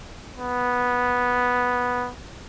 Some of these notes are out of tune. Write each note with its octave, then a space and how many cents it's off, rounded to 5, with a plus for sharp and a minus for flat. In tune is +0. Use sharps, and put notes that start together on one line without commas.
B3 -5